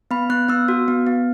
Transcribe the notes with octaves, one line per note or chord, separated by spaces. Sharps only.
B3 B5
B3 F#6
B3 E6
F#4
B3
B3